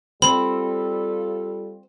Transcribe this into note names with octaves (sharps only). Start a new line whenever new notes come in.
G3 C4 F4 A4 B5